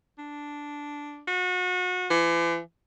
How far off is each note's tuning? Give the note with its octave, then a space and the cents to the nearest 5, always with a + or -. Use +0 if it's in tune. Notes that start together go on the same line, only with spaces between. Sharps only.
D4 -5
F#4 -30
E3 +40